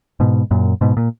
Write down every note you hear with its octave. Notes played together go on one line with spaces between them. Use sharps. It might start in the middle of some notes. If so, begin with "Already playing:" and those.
G#2 B2
F#2 A#2
G#2 B2
A#2